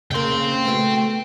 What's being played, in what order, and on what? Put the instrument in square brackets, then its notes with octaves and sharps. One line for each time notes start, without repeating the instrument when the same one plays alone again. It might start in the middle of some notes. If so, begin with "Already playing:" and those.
[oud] C#3 A#3 [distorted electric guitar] G5 C6
[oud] A3 B3 F#4